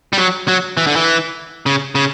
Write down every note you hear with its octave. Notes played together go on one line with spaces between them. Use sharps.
G3
F#3
F#3
E3
D3
E3
C#3
C#3